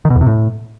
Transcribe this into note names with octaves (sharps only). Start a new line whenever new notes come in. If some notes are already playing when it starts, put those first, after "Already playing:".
D#3
B2
E2
C3
A2